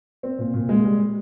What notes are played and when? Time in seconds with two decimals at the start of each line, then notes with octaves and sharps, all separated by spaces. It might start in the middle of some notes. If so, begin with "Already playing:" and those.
0.23 C4
0.38 A#2
0.54 A#2
0.69 G#3
0.84 G3